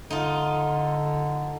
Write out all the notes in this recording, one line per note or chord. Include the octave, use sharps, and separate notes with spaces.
D3 D#4 F4